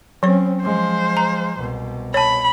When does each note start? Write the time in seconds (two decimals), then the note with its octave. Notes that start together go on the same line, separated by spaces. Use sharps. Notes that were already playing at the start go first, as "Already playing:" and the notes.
0.23 F#3 C4 C#4 C#5
0.62 F3 G#3 C5
1.17 A#5
1.58 C2 B2
2.14 C#5 A5 B5